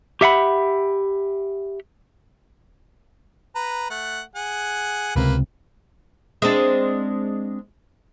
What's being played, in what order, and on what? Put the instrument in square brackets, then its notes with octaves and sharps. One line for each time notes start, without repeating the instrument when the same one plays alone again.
[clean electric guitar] G4 E5 F#5 B5
[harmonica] B4 A#5
A3 F#5
G#4 F#5
[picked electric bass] C#2 C3 [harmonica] A#3 B4
[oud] G#3 C4 D4